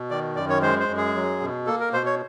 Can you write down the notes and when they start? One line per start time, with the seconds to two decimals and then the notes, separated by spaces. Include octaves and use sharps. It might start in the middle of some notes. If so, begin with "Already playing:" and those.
Already playing: B2
0.10 D#3 D5
0.36 F#2 D5
0.49 C#5
0.62 G#3 C5
0.80 C5
0.89 F#2
0.97 G#4
1.15 F#3
1.41 B2
1.67 A#3 A4
1.80 A#4
1.93 B2 C5
2.06 C#5